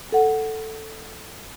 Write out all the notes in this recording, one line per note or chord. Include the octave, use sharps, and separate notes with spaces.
A4 F#5